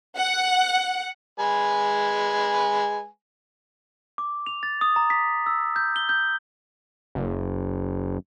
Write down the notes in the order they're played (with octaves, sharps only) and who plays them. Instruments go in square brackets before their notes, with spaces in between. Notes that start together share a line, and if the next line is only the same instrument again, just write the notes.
[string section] F#5
[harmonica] G#3 B4 G#5
[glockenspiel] D6
F7
A6
D#6
A#5
B6
E6
G6
G7
G6
[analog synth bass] F#1